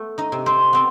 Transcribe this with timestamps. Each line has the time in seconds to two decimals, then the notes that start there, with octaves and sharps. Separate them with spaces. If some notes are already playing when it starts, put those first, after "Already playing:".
Already playing: A3 B3
0.18 D#4 D#5
0.32 C3
0.46 C4 C5
0.73 B3 C4